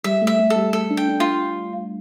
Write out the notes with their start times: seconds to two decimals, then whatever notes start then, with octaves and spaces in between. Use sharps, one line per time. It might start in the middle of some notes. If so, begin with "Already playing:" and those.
0.04 G3 E5
0.22 A3
0.27 E5
0.39 A3
0.50 A4
0.56 G3
0.73 A3 A4
0.91 D4
0.97 G5
1.09 D4
1.20 F4